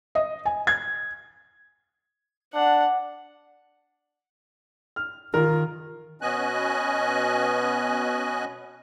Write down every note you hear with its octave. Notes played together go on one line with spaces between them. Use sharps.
D#5
G#5
G#6
D4 F#5
F6
D#3 F4 A#4
B2 B3 C#4 D#5 G#5 F#6